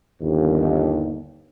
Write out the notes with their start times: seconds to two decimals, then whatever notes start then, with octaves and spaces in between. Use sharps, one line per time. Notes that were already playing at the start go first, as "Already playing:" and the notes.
0.21 G1 D#2